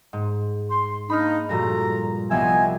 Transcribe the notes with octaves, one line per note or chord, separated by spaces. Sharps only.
G#2
C6
A#3 D4 D#4 B5 F6
G2 A#2 F3 F#4 A4 A#5
C2 F3 B3 D#5 E5 G#5